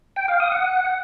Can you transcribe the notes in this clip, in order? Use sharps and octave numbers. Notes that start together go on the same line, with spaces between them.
G5
F5
D#6
F#5